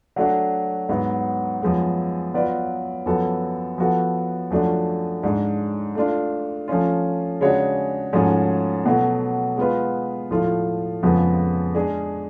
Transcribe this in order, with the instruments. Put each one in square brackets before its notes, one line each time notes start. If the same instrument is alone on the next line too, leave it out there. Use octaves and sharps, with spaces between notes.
[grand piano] F#3 A3 D4 F#4
G#2 F#3 B3
F#2 F3 G#3 B3
F#3 B3 F4 B4 D5
F#2 F3 B3 F#4 A4
F3 B3 F#4 A4
F#2 F3 A3 D4 F#4
G#2 G#3 D4
A3 D4 F4
F3 A3 C#4 F4
C#3 G#3 D4 F#4 C#5
G#2 F3 A3 C#4 F#4
B2 F#3 A3
G#3 B3 F4 B4
A2 F3 A3 F4
F2 C#3 F3 G#3 B3
G#3 D4 G#4